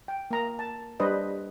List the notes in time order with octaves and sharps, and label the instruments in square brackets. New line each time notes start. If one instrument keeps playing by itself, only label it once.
[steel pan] G5
A#3 A#5
A5
G3 D4 B4 C5 D#5